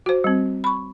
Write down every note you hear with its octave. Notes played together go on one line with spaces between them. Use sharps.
F#4 C5
G3 C4
B5 C#6